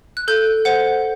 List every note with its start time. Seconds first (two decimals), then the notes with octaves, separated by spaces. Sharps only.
0.17 F#6
0.28 A4 G6
0.65 C5 F#5